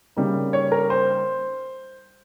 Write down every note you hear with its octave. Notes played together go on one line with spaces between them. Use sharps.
C#3 G3 A#3 D#4
C#5
A#4
C5